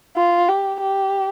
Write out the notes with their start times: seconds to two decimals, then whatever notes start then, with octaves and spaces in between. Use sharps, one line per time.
0.16 F4
0.48 G4
0.80 G4